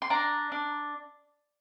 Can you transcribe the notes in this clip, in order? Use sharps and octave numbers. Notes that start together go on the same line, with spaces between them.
C6
D4 A#5
D4